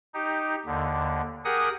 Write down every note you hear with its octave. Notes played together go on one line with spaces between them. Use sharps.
D#4 G4
D#2 D3
G4 G#4 A#4 F#5 D#6